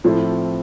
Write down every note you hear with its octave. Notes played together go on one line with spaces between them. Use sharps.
A2 F3 C4 E4 A4